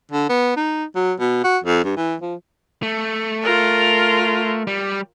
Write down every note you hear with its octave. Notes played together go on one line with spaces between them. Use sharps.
D3
B3
D#4
F#3
B2
F#4
F2
G2
E3
F3
A3
F4 A#4
G3